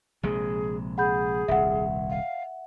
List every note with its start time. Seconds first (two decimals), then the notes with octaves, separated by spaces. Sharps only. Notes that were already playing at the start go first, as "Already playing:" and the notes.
0.23 A#1 C3 G#3 G#4
0.98 G#4 F#5 B5 G6
1.48 D#1 C2 E5 F#5
2.10 F5